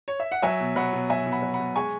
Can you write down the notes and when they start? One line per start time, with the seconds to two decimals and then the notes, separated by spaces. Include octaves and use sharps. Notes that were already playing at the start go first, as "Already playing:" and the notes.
0.08 C#5
0.20 E5
0.32 F#5
0.42 F#3 E5 G#5
0.60 B2
0.76 F#3 F#5 B5
0.93 B2
1.10 F#3 E5 G#5
1.26 B2
1.32 F#5 B5
1.42 F#3
1.54 F#5 B5
1.59 B2
1.76 G#3 G#5 C#6